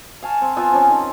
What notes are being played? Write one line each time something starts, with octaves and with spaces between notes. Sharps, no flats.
F5 G#5 A5 C#6
C4
B3 F4 E5 G#5
F3 C4 C#4
D#3